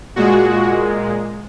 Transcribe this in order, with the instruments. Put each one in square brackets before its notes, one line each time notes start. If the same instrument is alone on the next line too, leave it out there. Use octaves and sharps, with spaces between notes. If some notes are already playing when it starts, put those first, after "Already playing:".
[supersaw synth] A#2 G#3 F#4